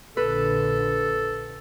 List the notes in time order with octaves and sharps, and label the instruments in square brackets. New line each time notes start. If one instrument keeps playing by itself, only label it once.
[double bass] A#1 D3 [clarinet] A4 [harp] B4